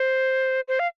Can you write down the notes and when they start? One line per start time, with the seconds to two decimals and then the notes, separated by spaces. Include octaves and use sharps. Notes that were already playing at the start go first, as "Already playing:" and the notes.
Already playing: C5
0.68 C5
0.79 F5